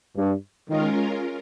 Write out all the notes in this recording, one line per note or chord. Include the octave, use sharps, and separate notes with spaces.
G2
D#3 G#3 C#4 F4 A#4